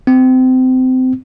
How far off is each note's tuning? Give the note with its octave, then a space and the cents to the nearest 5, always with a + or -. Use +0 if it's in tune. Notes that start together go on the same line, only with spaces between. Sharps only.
C4 -25